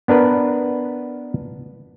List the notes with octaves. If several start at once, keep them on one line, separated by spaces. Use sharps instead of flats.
B3 D4 A#4 B4